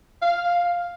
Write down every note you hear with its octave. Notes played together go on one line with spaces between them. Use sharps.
F5